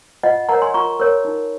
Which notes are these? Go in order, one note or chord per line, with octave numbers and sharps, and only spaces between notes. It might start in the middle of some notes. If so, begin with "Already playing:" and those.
F4 D#5 F#5
A#4 C#5 F#5 A#5
G#5 C6
F4 A#5 C#6
A#4 C#5
D#4